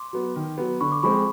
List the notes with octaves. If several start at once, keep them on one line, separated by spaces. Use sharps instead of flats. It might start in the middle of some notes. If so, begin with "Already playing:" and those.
Already playing: C6 D6
F#3 B3
D#3
F#3 B3
D3 B5 C#6
D6
F3 G#3 C4 B5 C#6